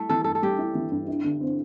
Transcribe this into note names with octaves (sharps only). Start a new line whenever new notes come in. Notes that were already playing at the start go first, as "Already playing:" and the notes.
Already playing: G3 A3 E4
E3 A4
G2 A4
A4
G3 G4
E4
E3
G2
E4
D3
C4